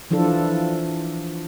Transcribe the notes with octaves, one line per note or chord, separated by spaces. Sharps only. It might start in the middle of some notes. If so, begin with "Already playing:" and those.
E3 F3 D4 F4 A4